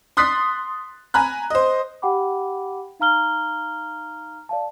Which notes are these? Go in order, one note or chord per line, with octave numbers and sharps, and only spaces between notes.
C6 D#6 F#6 A6 B6 C7
G#5 A#5 B5 F#6
C5 D#5
G4 F#5 G5 B5 D6
D#4 F5 A#5 F6 G7
D5 F5 A5